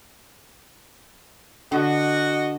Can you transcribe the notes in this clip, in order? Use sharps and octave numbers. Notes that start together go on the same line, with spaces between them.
D3 F#4 D#5